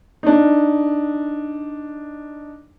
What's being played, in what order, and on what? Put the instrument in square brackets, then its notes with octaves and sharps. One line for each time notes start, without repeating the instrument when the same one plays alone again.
[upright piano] D4 D#4